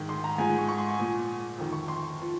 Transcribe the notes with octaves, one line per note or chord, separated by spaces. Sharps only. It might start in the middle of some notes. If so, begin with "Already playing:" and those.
Already playing: G#2 D#3
C6
A#5
G#2 F3 G#5
C#6
C#6
C6
G#5
A#2 F3
F2 D#3
C#6
C6
F3